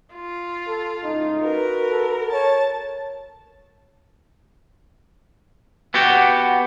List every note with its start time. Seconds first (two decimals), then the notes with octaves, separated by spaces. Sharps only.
0.14 F4
0.67 A4
1.04 C#2 A2 D#4
1.43 F#4 A#4 B4
1.90 A4
2.33 A#4 C#5 A5
5.94 B3 F#4 G4